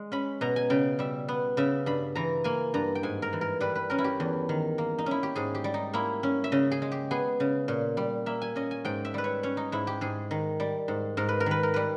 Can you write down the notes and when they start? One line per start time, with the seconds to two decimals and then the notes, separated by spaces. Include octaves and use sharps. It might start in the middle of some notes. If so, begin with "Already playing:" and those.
Already playing: G#3
0.12 C#4 B5
0.41 B2 A#5
0.56 G#5
0.70 C#3 G5
0.99 G3 E5
1.28 B3
1.57 C#3 E5
1.86 G2 B5
2.15 E3 A#5
2.44 A#3 G#5
2.74 G2 A#5
2.95 G5
3.03 G#2 G#5
3.22 A#4
3.33 E3
3.41 A#4
3.60 G3 B4
3.75 B4
3.90 C#4 A#4
3.98 E4
4.04 G4
4.20 E2
4.49 D#3
4.78 A#3
4.98 D#4
5.06 C#4 E4
5.23 G4
5.36 G#2 G#4
5.55 G4
5.64 G3
5.74 D#4
5.93 A#3 E4
6.23 C#4
6.44 E5
6.52 C#3 D#5
6.71 G#4
6.82 G#3
6.92 G4
7.11 B3 G#4
7.40 C#3
7.68 A#2
7.97 G3
8.26 A#3 E5
8.42 G#5
8.56 C#4 D#5
8.71 G#5
8.85 G#2 G5
9.05 E5
9.14 G3 B4
9.24 C#5
9.43 C#4 C#5
9.57 D#4
9.72 G#2 E4
9.87 G4
10.01 G#2 G#4
10.31 D#3
10.60 G3
10.88 G#2
11.17 G#2 A#4
11.29 B4
11.40 A#4
11.46 D#3 B4
11.63 A#4
11.74 G3 B4